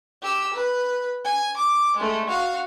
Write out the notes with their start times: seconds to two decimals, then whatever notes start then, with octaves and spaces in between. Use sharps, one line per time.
0.22 G4 E6
0.53 B4
1.25 G#5
1.56 D6
1.96 G#3 A3
2.29 F#4 F5